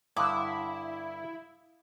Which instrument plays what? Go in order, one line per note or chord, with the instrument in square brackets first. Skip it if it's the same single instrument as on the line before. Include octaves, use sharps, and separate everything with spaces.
[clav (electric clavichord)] G2 D3 [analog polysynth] E4 [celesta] F5 D#6 [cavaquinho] D6